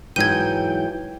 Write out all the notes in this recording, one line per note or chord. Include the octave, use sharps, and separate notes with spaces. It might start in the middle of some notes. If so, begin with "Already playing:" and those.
G#2 E3 F#3 G5 G6 G#6 D#7